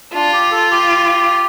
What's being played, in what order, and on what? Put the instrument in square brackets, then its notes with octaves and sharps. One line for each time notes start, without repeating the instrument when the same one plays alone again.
[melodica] D4 [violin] F4
[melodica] G4
A4
G4